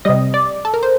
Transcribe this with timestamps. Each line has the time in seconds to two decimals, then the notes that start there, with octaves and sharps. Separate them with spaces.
0.05 C3 G3 D#5
0.34 D5
0.65 A4
0.74 A#4
0.83 C5